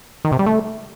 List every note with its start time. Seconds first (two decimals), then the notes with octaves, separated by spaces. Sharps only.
0.25 D#3
0.32 C3
0.39 G3
0.46 A3